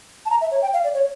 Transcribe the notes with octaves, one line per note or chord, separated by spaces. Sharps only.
A5
A#5
E5
C#5
G5
F5
D5
C#5